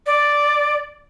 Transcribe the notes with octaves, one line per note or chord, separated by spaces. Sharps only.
D5